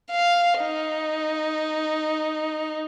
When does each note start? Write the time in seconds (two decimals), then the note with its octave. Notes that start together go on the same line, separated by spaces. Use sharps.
0.11 F5
0.61 D#4